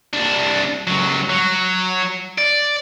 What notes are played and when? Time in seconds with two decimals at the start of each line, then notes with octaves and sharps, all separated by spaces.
0.13 C2 D4
0.87 C#2 F#3
1.30 F#3
2.38 D5